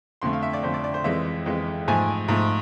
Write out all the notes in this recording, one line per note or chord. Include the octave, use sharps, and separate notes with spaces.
F2 D3 A3 C6
F5
E5
D5
F2 D3 A3 C5
D5
D5
C5
F2 E3 G#3 E5
F2 E3 G#3
G#2 F3 A3 G#5
G#2 F3 A3